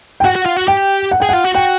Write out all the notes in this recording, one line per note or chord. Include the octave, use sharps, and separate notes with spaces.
G5
F#4 F#5
F#4
F4
F#4
G4 G5
F#5
G#4 G5
F4 F#5
F#4
F#4 G5